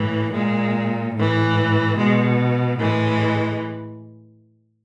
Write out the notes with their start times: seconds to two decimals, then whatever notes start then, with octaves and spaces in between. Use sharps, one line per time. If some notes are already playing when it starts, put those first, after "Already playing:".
Already playing: A2 E3
0.32 A#2 G#3
1.15 A2 E3
1.97 B2 G#3
2.79 A2 E3 G#3